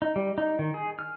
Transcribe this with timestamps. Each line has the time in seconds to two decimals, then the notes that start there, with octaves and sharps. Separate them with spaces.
0.02 D#4
0.16 G3
0.38 D#4
0.59 D#3
0.74 G#4
0.99 F6